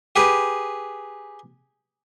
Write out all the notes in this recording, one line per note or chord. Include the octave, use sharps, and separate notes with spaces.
G4 G#4 B4